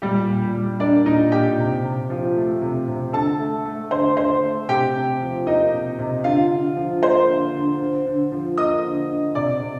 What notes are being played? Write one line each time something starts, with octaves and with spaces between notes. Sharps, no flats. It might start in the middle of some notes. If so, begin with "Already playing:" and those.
A#2 G3 G4
A#2
G3
A#3 D4 D5
A#2 D#4 D#5
A#2 G4 G5
C3
C3
F3
A3
C3
C3
D3 A4 A5
A3
A3
D3 C5 C6
D3 C5 C6
A3
C3 G4 G5
C3
F3
A#3 D#4 D#5
C3
C3
D3 F4 F5
D3
F3
A#3 C5 C6
D3
D3
D3
D3
F3
A#3 D#5 D#6
D3
D3
C3 D5 D6
C3